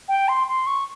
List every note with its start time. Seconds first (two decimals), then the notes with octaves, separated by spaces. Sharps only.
0.08 G5
0.28 C6
0.47 C6
0.67 C#6